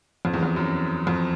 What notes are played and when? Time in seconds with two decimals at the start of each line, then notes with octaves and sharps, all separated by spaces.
0.25 F2
0.34 E2
0.43 F2
0.56 F#2
1.07 F2